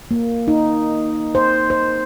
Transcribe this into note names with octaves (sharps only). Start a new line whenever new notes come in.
A#3
D#4
C5
C5